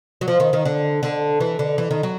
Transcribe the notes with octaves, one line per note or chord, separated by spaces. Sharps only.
F#3
F3
D#3
D#3
D3
D3
E3
D3
E3
D#3
F#3